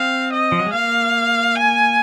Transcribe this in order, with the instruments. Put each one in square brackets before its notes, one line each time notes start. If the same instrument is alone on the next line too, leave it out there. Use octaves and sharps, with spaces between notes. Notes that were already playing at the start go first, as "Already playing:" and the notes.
Already playing: [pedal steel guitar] C4 [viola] F5
[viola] D#5
[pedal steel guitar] F3
F#3
G#3
[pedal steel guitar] A#3 [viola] F5
[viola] G#5